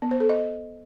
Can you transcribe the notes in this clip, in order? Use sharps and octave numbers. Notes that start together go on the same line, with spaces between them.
B3
C5
A4
D#5